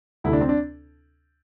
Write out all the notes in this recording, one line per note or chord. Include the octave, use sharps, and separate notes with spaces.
D2 C3 A3 E4
D4
C4
D4